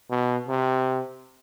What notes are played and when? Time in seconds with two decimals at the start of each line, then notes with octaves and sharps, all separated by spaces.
0.10 B2
0.48 C3